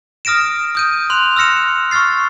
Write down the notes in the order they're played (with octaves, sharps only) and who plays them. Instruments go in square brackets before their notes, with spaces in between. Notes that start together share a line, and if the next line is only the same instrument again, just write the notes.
[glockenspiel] D#6 F6 A#6 D7 E7
D#6 G6 D#7
C6 F#6 F7
E6 F6 A#6 C#7 E7
C#6 E6 F6 A6 C7